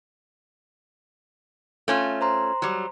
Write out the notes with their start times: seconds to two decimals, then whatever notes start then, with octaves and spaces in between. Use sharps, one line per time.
1.88 A3 C#4 F4
2.21 C5 A#5 C6
2.62 F#3 G3